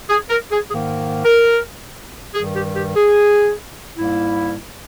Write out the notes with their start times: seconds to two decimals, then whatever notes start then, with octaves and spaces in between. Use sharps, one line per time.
0.10 G#4
0.30 A#4
0.51 G#4
0.71 G#2 D#3 A#3 G#4
1.25 A#4
2.35 G2 D#3 G3 G#4
2.55 G4
2.76 G4
2.96 G#4
3.98 G#2 G3 A#3 E4